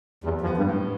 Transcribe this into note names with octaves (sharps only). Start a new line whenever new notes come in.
E2 G3
F2
B3
G2
A2